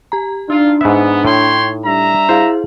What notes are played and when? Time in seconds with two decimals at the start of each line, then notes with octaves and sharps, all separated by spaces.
0.12 G4 A#5
0.50 D4 D#4 F4
0.81 G#2 B3 E5
1.25 A2 C#5 G5 C6
1.85 G3 D4 E5 A#5
2.29 E4 G#4 C5 F5